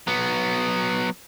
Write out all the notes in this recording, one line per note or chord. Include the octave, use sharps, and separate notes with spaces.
F#3 B3